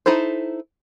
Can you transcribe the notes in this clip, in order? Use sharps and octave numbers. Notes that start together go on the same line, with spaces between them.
D#4 E4 A4 C5